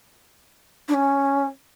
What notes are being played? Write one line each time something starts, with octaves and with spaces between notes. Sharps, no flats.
D4
C#4